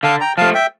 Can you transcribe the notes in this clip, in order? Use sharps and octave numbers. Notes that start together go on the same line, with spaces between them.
D3 F5 A5
G5 A#5
F3 A3 F5 A5
E5 G5